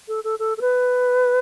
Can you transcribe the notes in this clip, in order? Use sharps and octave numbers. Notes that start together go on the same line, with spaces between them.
A4
A4
A4
A4
B4